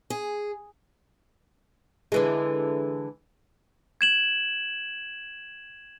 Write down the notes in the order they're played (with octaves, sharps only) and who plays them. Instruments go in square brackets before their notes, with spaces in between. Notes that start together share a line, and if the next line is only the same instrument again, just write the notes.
[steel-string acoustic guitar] G#4
[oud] D3 E3 G#3
[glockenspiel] G#6 E7 F#7